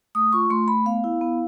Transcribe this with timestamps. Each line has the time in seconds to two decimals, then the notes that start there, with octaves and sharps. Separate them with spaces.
0.15 A3 D#6
0.33 F4 C#6
0.50 A3 C6
0.68 A3 B5
0.85 B3 F5
1.04 E4
1.21 B3